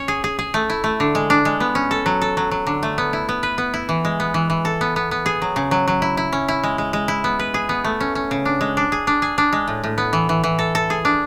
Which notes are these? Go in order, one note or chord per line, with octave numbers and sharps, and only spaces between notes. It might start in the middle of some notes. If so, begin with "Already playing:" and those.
Already playing: C#4 C#5
G#4
G#4
G#4
A3
E4
A3
D3
G#3
D4
G#3
B3
C#4
A4
F#3
A4
F#3
F#3
D3
A3
B3
E4
B3
B4
B3
E4
E3
G#3
B3
E3
E3
A4
B3
B3
B3
G#4
F#3
C#3
F#3
F#3
E4
E4
C#4
E4
G#3
G#3
G#3
E4
B3
B4
G#4
B3
A3
C#4
C#4
C#3
D4
G#3
D4
G#4
D4
G#4
D4
G#3
A2
A2
B3
E3
E3
E3
A4
A4
G#4
D4